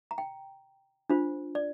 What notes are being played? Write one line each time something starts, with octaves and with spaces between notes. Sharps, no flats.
A#5
G5
D4 F4 C5
D5